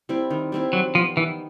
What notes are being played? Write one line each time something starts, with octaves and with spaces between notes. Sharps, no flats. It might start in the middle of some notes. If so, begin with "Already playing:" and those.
G3 C4 E4
D#3
G3 C4 E4
D#3 F#3
F3 G3 B3
D#3 E3